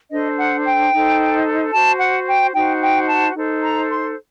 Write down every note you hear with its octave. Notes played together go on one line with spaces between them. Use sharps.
D4 A4 C5 D#5
F#5
G5
D#4 A4 C5
F#4 C5 A5
F#5
G5
D#4 F#4 C5 G5
G5
A5
D#4 A4 C5
A#5
C6